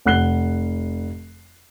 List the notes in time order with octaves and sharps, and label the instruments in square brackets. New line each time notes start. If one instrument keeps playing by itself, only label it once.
[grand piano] F1 F#5 F#6 C7 G7